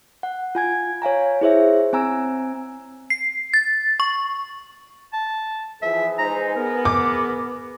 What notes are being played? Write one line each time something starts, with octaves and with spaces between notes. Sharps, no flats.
F#5
F4 G#5 G#6
C#5 F5 G#5 A#5
E4 G#4 C5 C#5 E5
C4 G#5 A#5 E6
C7
A6
C#6
A5
E2 F3 G#4 B4 E5
G#3 D#4 C5 A#5
B3 A#4
D6